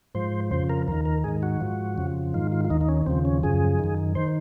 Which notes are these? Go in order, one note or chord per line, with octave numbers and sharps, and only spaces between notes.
G#2 F3 C5
F2 C#3 F3 C5
A#4
D#2 D#3 A#4
A#4
G#2 D#3 G#4
F#4
G#2 F3
F2 C#3 F3
G#2 D#3 F4
F4
F4
D#2 D#3 D#4
D#4
C#4
D#2 C#3 F3 C4
C#4
F#2 C#3 F3 G#4
F#2 D#3
D#3 C5